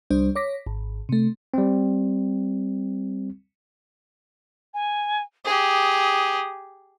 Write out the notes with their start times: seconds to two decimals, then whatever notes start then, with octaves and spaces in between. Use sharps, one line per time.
0.10 C2 G3 D4 C5
0.36 C#5 D6 A#6 B6
0.67 G#1
1.09 C3 A3
1.54 G3 C4
4.74 G#5
5.45 G4 G#4 D#6